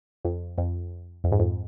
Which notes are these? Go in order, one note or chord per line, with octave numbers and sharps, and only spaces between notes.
F2
F2
F2
G#2
F2